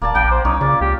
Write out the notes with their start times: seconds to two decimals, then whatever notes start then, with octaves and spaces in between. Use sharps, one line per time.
0.02 D#1 A#3 D5 A5
0.15 A#1 A#3 G5
0.31 C5
0.45 C2 C#4 D#4
0.61 A#2 C#3 D5
0.81 C#2 G4